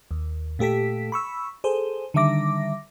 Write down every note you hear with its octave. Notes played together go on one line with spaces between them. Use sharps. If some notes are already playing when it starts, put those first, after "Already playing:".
D#2
A#2 A3 G4 A4 B6
B5 C#6 E6
G#4 A4 C5
D3 D#3 G3 E5 D6 A#6